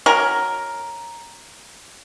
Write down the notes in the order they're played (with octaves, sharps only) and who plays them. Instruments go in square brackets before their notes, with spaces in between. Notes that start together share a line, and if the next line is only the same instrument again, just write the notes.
[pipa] C#4 F#4 A#4